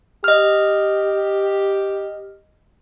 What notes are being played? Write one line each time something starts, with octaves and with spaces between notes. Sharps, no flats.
G4 D#5 F6